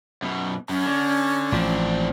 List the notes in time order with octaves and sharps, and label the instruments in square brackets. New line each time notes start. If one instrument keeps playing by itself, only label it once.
[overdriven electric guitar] F#2 B2
[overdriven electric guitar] F#2 [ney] C#4
[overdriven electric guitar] D3
[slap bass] A1 F3 [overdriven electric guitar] C4 D4